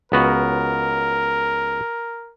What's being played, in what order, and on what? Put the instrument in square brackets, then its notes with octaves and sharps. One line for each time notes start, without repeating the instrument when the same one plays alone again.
[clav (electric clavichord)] C#2 B3 F#4 [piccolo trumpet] A#4